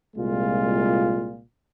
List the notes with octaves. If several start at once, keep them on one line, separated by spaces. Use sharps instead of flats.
C2 A#2 G#3 F4